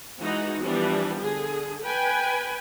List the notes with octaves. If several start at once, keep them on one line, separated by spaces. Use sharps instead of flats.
E3 G#3 D#4 F#4
E3 F3 G3 B3 D4
D3 G#4
B4 G5 G#5